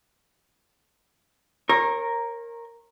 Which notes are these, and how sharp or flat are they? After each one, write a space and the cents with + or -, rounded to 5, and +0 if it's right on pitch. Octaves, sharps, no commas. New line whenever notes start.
A#4 +0 C#5 -35